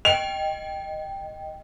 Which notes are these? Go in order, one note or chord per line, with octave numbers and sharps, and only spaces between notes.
D#5 G5 F7